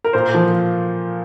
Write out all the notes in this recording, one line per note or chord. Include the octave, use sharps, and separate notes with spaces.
A#4
A#2 C5
F3